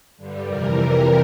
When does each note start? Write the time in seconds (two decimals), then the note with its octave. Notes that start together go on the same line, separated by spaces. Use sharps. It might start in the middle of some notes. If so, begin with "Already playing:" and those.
0.17 G2 D3 G3
0.46 F2 C3 E3 G3 A#4